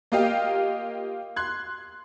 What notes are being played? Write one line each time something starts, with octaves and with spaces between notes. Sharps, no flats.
A#3 F4 G4 D#5 F5 G5
C6 F#6 G#6